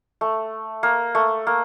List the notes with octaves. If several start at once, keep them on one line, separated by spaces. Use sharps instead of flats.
A3
A#3
A3
A#3